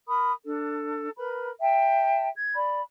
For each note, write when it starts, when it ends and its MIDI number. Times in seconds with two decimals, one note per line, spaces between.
0.08 0.32 70
0.08 0.32 83
0.08 0.32 87
0.46 1.09 62
0.46 1.09 69
1.18 1.51 70
1.18 1.51 71
1.18 1.51 83
1.62 2.29 76
1.62 2.29 79
1.62 2.29 81
2.35 2.54 92
2.55 2.82 74
2.55 2.82 83